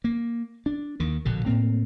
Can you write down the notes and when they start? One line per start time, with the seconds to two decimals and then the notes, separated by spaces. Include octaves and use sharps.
0.04 A#3
0.66 D4
1.00 D#2 D#3
1.25 A#1 B2 D3
1.46 A2 A#3 C4